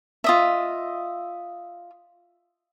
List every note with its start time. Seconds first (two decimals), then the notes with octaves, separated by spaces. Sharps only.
0.24 F4 D#5 E5